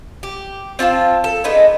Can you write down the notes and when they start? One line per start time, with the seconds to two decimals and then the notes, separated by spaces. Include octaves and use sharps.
0.23 G4
0.79 C4 F4 F5 A5
1.24 A4
1.44 G#3 B3 D4 D#4